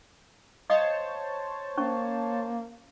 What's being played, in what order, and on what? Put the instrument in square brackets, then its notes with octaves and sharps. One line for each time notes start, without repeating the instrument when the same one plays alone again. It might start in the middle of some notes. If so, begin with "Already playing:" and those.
[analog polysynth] C5 C#5 A5 [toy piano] D#5 F5 D#6
[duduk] A#3 [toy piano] C#4 C#6